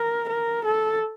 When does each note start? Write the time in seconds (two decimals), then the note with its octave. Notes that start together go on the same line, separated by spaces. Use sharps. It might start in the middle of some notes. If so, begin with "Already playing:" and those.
Already playing: A#4
0.29 A#4
0.65 A4